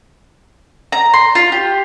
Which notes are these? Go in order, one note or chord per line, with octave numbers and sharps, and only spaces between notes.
A#5
C6
F4
G4